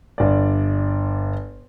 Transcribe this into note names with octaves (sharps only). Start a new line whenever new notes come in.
G1 D5